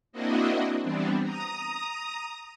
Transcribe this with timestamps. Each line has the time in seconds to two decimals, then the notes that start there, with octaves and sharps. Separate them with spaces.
0.12 A#3 C4 D4 E4 F#4 D#5
0.83 E3 G3 B3 C4 D4
1.22 A#5 D#6